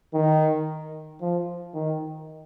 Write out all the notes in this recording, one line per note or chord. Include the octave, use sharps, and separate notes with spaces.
D#3
F3
D#3